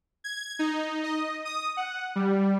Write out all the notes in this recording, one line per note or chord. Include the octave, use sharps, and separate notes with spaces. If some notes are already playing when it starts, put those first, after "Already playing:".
G#6
D#4
D#5
D#6
F#5
G3